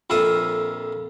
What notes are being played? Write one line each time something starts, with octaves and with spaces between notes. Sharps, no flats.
A#1 F2 A4 E5 F5 D#6